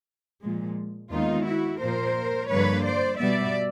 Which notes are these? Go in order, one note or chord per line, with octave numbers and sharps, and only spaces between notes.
A#2 F3 G#3
D#2 D#3 G#3 B3 D#4 F4
E4 F#4
A#2 F3 A#3 A#4 C5
G2 D3 F3 A#3 B4 C#5
C5 D5
B2 G3 B3 D5 E5